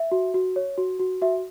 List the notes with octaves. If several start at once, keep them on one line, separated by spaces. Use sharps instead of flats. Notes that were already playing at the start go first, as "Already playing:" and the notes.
Already playing: E5
F#4
F#4
C#5
F#4
F#4
F#4 E5